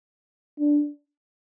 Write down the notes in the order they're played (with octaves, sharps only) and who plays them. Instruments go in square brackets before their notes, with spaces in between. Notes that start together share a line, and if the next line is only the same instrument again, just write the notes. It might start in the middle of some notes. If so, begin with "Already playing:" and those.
[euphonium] D4